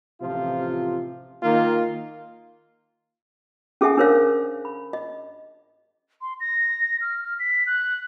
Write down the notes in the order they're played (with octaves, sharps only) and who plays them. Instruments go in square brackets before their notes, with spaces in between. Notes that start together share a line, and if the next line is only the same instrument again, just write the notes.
[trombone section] A1 C3 F3 F4
D#3 A#3 D#4 F4
[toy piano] C#4 G#4 A4 E5 F#5 G#5
D4 A#4 C5 C#5 F5
B5
D#5
[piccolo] C6
A#6
F6
F6
B6
F#6